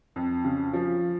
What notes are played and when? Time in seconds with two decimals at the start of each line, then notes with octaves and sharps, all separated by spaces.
0.16 F2
0.44 C#3
0.73 F3